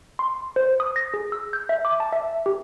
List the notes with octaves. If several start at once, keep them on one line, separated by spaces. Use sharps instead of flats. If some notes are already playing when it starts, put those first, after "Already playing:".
C6
C5
D#6
A#6
G#4
E6
G6
E5
D6
A5
E5
G4